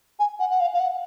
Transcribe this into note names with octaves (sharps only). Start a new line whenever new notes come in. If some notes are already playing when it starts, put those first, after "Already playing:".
G#5
F#5
F#5
F5
F5
F#5